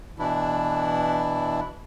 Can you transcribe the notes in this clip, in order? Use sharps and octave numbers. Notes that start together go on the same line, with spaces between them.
B2 E3 D4 E4